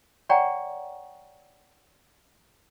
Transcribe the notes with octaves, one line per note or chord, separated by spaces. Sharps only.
C#5 D5 F#5 G5 A#5 C#6